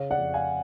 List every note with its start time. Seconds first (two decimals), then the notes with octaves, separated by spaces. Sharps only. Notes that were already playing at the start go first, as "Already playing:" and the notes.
Already playing: C#3 C#5 F5
0.11 D5 F#5
0.18 F2
0.34 F5 G#5